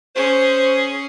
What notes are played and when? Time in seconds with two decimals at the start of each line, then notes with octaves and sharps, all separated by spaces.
0.16 C#4 G#4 C5